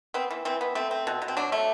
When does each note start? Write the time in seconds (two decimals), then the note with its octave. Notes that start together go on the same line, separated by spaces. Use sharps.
0.14 B3 C4
0.30 E3
0.45 E3 C4
0.61 B3
0.75 A3 C4
0.91 C4
1.07 B2
1.22 B2
1.28 C4
1.37 F#3 D4
1.52 A3